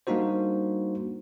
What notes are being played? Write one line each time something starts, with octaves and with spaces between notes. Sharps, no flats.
G3 A#3 D4 D#4 F#4 C5